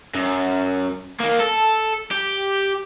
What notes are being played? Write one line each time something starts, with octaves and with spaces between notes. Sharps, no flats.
F#2
D#3 A#3
A4
G4